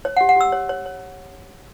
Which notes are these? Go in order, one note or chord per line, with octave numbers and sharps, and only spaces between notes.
C#5
F#5
G4
F#5
G4 E6
C#5
C#5
C#5